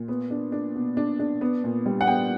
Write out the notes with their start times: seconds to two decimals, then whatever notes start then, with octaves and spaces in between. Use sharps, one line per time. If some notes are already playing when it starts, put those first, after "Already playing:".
Already playing: A#2
0.08 B3
0.30 D4
0.52 D4
0.75 B2
0.97 D4
1.19 D4
1.41 B3
1.64 A#2
1.86 G3
2.01 F#5
2.07 B3 G5